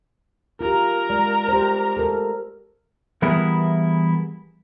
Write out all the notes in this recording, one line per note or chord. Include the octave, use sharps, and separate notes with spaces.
F4 G4 A#4 A#5
G#3 D5
G4 C5
A4 A#4
E3 G3 B3 E4 G#4 A#4